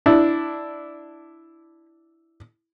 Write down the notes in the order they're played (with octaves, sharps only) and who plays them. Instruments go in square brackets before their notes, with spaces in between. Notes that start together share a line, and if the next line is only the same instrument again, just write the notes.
[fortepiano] D4 E4